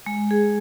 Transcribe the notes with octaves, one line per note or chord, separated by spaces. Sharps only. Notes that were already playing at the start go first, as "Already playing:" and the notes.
G#3
G#4